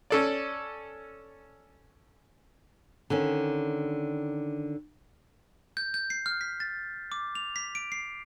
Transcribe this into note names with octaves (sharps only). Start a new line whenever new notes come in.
C#4 A4 D5
D3 D#3 C#4
G6
G6
C7
F6
B6
A6
D6
F7
B6
D7
C7